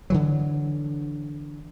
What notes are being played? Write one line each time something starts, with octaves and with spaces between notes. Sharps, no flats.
D3 E3 F#3